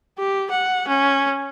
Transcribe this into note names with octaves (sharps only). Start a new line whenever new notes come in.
G4
F#5
C#4